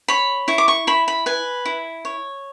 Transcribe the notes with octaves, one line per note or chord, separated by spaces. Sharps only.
C#5 B5
E4 C#6
D6
C#6
E4 B5
B5
B4 G#5
E4
C#5